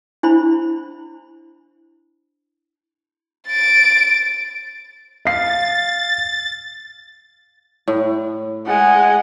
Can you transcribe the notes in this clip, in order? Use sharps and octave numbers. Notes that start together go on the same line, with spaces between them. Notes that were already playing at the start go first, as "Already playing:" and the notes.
D4 E4 C5 B5
A6 D7
F5 A6 C7
A2
G#3 F#5